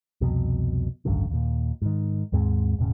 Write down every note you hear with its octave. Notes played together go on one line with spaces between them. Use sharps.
C2 F2 B2
G#1 C#2 F#2 D3
D#2 A#2
G#2 D#3
D#2 G#2 G#3 C4
E1 A2 C#3